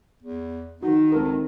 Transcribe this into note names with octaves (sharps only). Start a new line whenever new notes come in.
E2
D#3 D#4 F#4
C#2 C4 A4 A#4